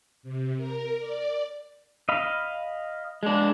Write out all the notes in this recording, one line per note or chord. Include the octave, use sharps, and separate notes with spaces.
C3
A#4
D5
D#5 F5 B5
G#3 D4